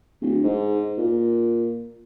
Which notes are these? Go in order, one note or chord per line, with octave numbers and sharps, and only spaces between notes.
D1
G#2
A#2